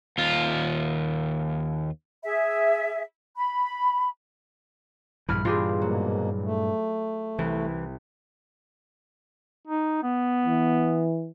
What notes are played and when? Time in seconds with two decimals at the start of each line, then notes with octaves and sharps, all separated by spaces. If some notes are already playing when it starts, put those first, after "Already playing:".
0.18 D#2 F4
2.23 G#4 E5
3.36 B5
5.29 A#1 G2 E3 B5 F6
5.45 G2 A#2 E3 F4 G4 G#4
5.82 G#2 B2 F#3 A#3
6.44 A3
7.39 C2 E3
9.67 D#4
10.03 B3
10.46 E3